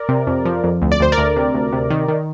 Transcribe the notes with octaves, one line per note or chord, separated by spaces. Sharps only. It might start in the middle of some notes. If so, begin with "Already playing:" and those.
Already playing: A#4 D5
C3
F2
F3
F2
D2
D5
D2 C5
A#4 D5
D2
C3
D2
C3
D#3
D#3